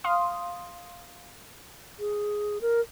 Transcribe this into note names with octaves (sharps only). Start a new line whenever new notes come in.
F5 C6 D#6
G#4
A#4